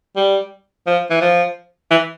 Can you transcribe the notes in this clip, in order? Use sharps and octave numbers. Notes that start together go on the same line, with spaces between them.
G3
F3
E3
F3
E3